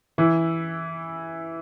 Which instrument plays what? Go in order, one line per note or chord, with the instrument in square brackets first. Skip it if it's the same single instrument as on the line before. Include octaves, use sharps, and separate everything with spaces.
[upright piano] E3 E4